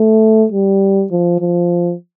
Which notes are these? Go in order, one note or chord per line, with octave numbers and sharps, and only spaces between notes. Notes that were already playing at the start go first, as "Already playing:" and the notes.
Already playing: A3
G3
F3
F3